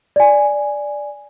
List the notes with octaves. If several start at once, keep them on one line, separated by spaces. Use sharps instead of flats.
D5 G#5